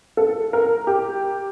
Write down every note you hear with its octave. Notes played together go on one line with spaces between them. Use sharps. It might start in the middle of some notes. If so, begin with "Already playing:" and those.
A4
A#4
G4